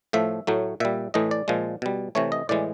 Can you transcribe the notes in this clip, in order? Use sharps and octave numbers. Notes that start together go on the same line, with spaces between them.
A2 F3 A3 E5
A2 F#3 A3
A#2 G3 E5
A2 E3 A3 D#5
D5
A#2 F3 G#3
B2 G3
C3 E3 A3 C#5
D#5
A2 E3 G#3 D5